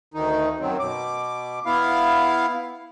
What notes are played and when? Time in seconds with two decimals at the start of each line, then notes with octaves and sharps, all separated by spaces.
0.14 D2 D#3 D#4
0.60 F#2 D#3 F#3 C4
0.80 B2 D6
1.66 B3 E4 F5